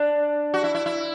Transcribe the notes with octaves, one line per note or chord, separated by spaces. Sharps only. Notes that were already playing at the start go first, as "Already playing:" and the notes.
Already playing: D4
F#4
E4
E4
E4